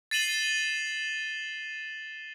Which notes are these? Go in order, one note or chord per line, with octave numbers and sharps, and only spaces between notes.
A6 C7 D#7 E7 F#7 G7